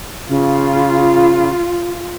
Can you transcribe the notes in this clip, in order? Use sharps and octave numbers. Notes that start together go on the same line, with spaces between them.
C#3 F4